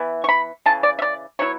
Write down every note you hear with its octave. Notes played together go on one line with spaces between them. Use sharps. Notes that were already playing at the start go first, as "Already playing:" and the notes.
Already playing: E3 B3 E4
C#6
B5
C#3 E3 A5
D5
E5
D5
F#3 B3 E4 C#5